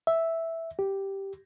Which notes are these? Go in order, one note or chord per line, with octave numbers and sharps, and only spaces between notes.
E5
G4